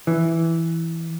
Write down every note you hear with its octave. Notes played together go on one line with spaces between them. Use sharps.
E3